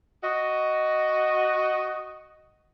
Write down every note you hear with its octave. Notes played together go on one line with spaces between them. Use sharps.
F#4 D#5